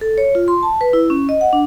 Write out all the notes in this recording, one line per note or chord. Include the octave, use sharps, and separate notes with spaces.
A4
C#5
F4
C6
A5
B4
E4
C#4
D#5
F#5
D4